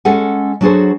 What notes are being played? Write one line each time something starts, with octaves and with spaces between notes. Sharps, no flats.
G#3 C#4 A4 F#5 G#5
F#3 D4 F#4 G#4 A4 C5